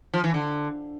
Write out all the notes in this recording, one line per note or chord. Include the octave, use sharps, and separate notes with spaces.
F3
E3
D3